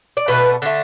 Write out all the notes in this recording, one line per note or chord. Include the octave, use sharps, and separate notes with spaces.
D5
B2 A3 B4
D3 A3